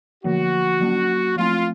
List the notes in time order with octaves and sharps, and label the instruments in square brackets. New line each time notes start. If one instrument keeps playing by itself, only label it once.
[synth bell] D3 F3 A#3 [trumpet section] F#4
[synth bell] F#3 A#3 C#4
[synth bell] F3 A3 C4 [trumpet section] F4